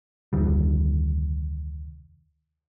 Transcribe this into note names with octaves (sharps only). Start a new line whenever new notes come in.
F1 D2 D#3 G3